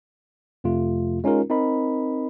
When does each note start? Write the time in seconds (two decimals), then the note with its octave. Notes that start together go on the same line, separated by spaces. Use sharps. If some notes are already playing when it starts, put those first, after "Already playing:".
0.64 F2 C3 A3 F4
1.24 G#3 C#4 D#4 F4 A#4
1.50 C4 D#4 A#4 D#5 B5